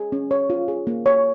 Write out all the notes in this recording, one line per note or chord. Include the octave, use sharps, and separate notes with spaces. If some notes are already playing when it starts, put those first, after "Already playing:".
Already playing: G#4
C#4
C#5
F4
G#4
A#3
C#5